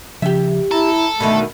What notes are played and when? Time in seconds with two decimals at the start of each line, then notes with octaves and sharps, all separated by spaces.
0.22 C#3 F3 G4 E5
0.71 E4 A4 A#5
1.20 B2 D3 D#3 A3 B5